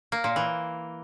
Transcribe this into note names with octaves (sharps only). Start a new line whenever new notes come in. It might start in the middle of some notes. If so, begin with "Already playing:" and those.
A#3
A#2
E3